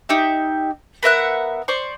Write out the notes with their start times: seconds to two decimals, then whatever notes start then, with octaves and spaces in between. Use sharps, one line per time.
0.09 D#4 G4 E5
1.03 B3 A#4 E5 F#5
1.68 C5 D5 C#6